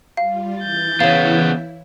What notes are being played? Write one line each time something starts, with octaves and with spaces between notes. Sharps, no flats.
G3 F4 F5
E3 E4 G6 A6
C#3 B3 C#5 F5